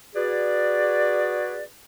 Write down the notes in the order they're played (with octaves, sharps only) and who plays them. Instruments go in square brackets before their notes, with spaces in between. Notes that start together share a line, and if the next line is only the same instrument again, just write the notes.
[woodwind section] F#4 G#4 B4 D5